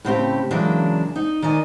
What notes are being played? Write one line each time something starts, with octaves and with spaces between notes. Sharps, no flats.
A2 C#3 C4 G4
C#3 E3 F#3 G#3 A#3 D4
D#4
D#3 D5 D#5 G#5